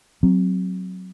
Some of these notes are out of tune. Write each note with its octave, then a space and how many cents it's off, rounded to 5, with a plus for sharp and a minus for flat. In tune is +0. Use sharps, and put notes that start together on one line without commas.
F#3 +0 C4 +0